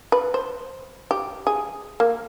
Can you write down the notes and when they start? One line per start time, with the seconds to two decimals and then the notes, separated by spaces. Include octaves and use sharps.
0.12 B4
0.34 C5
1.11 G4
1.47 G#4
2.00 A#3